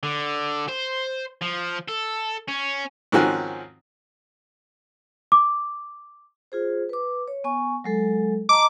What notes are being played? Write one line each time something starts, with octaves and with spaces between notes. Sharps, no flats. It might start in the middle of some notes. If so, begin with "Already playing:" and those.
D3
C5
F3
A4
C#4
G#2 D#3 F3 C4 C#4 F#4
D6
F4 G#4 C5
B4 D6
C#5
B3 G#5 C#6
F#3 G#3 A4
D#5 A5 A#5 D6